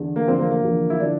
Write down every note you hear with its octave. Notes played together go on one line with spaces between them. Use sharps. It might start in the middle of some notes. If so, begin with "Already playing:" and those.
Already playing: E2 D3
A#3
E2 D3 F3 C4
A#3
A#3
E2 D3 F3
E4
D3 F3 D4